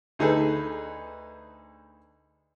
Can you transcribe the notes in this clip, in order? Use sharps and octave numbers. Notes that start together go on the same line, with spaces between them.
D2 D#4 G#4 A4 B4